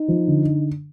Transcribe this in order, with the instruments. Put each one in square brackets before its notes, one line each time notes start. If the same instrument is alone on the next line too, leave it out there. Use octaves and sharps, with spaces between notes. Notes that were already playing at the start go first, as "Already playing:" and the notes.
Already playing: [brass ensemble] D#4
[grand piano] F3
D3